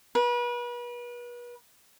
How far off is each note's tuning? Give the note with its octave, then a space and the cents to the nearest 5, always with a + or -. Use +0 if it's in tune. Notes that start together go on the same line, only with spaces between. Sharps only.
B4 -35